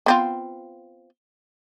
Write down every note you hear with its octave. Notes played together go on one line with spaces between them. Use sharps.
B3 C4 F4